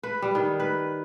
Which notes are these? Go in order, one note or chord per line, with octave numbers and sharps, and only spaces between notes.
B4
G3
D#3
B4